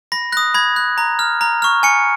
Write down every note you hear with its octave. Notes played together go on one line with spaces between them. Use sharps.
B5 A#6
D#6 F#6 A#6
B5 G#6
F#6
A#5
F6
A#5
C#6 F6
G#5 C#7